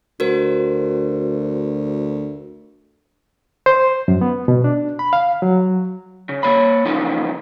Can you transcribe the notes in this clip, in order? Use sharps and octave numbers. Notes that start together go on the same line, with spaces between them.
D2 F#4 A#4 C5
C5
F#2
B3
B2
D4
B5
F5
F#3
C#3
A#3 C#5 B5
C#3 E3 F3 A#3 C#4 D#4